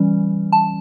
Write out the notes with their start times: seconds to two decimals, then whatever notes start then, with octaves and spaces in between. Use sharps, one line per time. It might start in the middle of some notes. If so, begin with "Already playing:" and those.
Already playing: E3 G3 C#4
0.53 A5